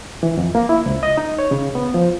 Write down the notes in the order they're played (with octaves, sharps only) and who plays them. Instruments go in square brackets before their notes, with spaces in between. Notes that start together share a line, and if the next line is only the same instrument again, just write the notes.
[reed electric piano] E3
F2
A#3
E4
C#2
D#5
D#4
C#5
C#3
B3
F3